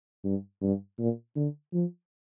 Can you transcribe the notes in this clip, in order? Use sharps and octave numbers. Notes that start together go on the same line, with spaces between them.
G2
G2
A#2
D3
F3